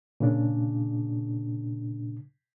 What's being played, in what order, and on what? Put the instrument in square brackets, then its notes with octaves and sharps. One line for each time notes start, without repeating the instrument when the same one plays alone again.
[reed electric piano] A#2 C#3 D4